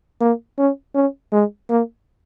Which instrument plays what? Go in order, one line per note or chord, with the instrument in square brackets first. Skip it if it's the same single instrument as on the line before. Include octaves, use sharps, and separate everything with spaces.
[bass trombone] A#3
C#4
C#4
G#3
A#3